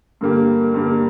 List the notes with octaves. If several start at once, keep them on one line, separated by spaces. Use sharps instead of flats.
G2 D3 A#3 G4
G2 D3 A#3 G4